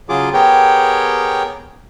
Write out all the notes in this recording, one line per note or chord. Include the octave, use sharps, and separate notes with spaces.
C#3 F#3 F4 G#4 D6
B3 G4 G#4 A#4 C#5 G5